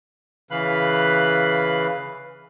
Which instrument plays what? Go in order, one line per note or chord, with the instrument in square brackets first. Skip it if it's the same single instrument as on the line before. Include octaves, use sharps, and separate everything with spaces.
[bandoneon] C#3 E3 B4 F5 B5 F#6